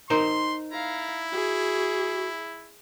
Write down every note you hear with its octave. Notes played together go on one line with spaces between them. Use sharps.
D#4 A#4 C5 C6
E4 F5 A#5
F#4 G#4